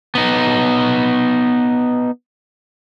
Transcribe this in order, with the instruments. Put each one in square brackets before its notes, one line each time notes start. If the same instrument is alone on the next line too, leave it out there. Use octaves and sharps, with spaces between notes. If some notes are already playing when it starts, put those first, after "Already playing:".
[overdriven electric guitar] B3 D#4